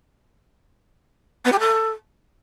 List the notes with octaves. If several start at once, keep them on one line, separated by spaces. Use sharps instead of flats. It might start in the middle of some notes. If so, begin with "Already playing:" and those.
B3
G4
A4